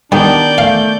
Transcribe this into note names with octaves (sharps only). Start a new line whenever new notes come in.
D#3 G3 B3 D4 D5 G6
A3 F5